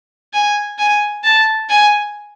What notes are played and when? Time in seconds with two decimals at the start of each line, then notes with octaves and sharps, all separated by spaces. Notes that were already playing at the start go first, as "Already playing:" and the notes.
0.33 G#5
0.78 G#5
1.24 A5
1.70 G#5